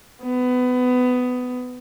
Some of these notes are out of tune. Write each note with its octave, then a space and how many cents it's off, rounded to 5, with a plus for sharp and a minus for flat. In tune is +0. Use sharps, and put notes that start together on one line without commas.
B3 +20